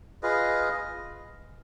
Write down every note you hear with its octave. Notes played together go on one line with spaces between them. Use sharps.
F4 G#4 B4 D#5